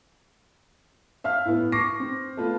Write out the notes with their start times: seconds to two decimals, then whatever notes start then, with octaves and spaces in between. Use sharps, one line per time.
1.24 E5 F5 F6
1.45 A2 B3
1.72 C#6 D6 A#6 C7
2.00 C4
2.37 A3 B3 F4 B4